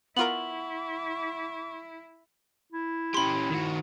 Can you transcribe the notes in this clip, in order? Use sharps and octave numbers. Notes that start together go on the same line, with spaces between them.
B3 E4 F4 A#4 F#5 C#6 F#7
E4
C#4 G4 B5 C6
D#3 F#4